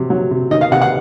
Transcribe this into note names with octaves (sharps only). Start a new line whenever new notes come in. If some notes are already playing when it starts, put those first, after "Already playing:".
Already playing: C3 F#3
F#3
C3
D#3 D#5
F5
C3 F#5
F#5